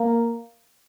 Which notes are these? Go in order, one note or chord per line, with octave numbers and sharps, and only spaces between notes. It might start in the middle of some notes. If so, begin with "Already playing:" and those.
Already playing: A#3